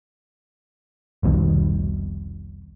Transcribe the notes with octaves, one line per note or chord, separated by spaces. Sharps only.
F1 C2 B2 D#3